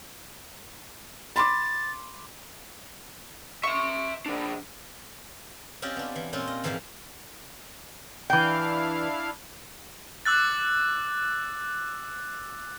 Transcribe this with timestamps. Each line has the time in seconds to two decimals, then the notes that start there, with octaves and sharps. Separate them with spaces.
1.36 B5 C6 D6 A6
3.63 E5 C6 C#6
4.26 F3 D4
5.82 C4 C#4 F4 G4 D5 D#5
5.96 B3 D4
6.16 E3
6.33 A#2 C4 C#4 F4
6.47 D#5
6.64 G#2 E3 F3 A#3 G4 F5
8.30 E3 D4 E4 F5 G5
10.25 D6 E6 F#6 A6